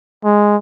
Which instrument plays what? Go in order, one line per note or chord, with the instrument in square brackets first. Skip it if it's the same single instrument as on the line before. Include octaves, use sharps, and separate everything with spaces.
[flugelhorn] G#3